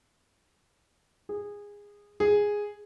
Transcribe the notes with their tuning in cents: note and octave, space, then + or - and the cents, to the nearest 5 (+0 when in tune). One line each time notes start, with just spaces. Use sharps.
G#4 -20
G#4 -5